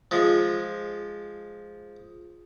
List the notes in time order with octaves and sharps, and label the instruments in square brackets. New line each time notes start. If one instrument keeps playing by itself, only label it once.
[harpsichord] F3 G#3